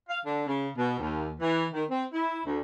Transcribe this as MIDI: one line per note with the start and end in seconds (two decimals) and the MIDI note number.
0.09 0.19 77
0.25 0.45 50
0.47 0.68 49
0.77 0.97 47
0.99 1.33 39
1.40 1.67 52
1.73 1.83 51
1.90 2.04 60
2.13 2.39 64
2.46 2.61 38